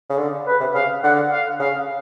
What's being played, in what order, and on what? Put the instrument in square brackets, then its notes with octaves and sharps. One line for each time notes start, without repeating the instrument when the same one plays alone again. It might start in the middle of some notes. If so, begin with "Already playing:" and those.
[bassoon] C#3
D3
[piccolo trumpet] B4
[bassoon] C3
[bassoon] C#3 [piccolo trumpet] F5
[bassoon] D3 [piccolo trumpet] F#5
[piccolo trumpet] F5
[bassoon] C#3 [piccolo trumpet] F5